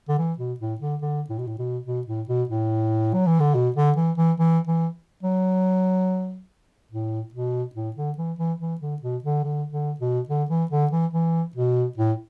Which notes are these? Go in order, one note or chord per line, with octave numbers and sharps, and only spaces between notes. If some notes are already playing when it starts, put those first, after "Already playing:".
D3
E3
B2
A2
D3
D3
A2
B2
A2
B2
B2
A2
B2
A2
F#3
E3
D3
B2
D3
E3
E3
E3
E3
F#3
A2
B2
A2
D3
E3
E3
E3
D3
B2
D3
D3
D3
B2
D3
E3
D3
E3
E3
B2
A2